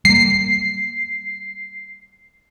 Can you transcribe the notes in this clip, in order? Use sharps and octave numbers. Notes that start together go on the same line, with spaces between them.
G3 A#3 C7